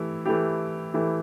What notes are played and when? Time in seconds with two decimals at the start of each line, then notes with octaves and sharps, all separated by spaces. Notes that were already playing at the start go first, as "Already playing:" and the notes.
Already playing: E3 A3 E4 G4
0.26 E3 A3 E4 G4
0.94 E3 A3 E4 G4